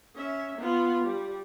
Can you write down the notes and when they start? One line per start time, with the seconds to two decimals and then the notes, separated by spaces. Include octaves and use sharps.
0.16 C#4 E5
0.58 B3 F4
1.04 G3